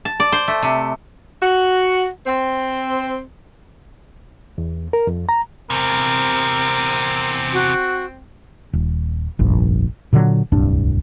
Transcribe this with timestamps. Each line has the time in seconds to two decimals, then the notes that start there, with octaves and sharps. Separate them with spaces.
0.05 A5
0.20 D5
0.32 C5
0.48 A3
0.63 C3
1.42 F#4
2.27 C4
4.58 E2
4.93 A#4
5.07 F2
5.29 A#5
5.70 E2 C3 C4 A#4
7.53 F#4
8.73 D#1
9.39 F1 A#1 G2
10.13 A#2 D3 D#3 F#3
10.52 D1 C2 G2 D4